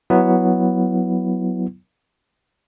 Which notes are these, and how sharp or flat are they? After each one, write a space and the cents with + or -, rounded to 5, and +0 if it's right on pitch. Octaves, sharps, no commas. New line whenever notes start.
F#3 +0 B3 +0 E4 +0